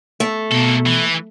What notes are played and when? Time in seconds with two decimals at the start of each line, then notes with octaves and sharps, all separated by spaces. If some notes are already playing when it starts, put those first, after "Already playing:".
0.20 A3
0.52 B2 A#3 A4
0.86 E3